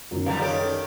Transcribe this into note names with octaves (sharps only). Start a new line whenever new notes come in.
F#2 D#3
G2 A#2 D3 G3 F5 A#5
D#3 C#4 G4 A4 D7
A4